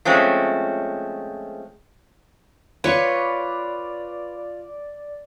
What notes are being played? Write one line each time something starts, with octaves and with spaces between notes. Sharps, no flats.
F3 G#3 A3 C4 C#4
F4 B4 C#5 D5 C#6